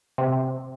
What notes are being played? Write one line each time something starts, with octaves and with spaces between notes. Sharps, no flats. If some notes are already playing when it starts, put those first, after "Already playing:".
C3